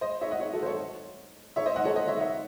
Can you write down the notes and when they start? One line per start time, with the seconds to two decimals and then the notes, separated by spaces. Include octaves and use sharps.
0.01 C5 D#5
0.21 C#5 E5
0.31 D#5 F#5
0.40 C#5 E5
0.53 F#4 A4
0.63 C5
0.66 A4 C#5
1.56 C#5 E5
1.66 C5 D#5
1.76 D#5 F#5
1.85 A4 C#5
1.96 C5 D#5
2.08 C#5 E5
2.21 C#5 E5